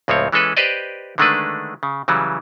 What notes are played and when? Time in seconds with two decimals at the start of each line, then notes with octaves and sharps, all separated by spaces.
0.08 C#2 A2 F3 C4 C#5
0.32 E3 G#3 C#4 A4 B4
0.57 G4 B4 C5 D5 D#5
1.18 D3 D#3 G#3 A3 D4 B4
1.83 C#3
2.08 C#3 E3 F#3 G3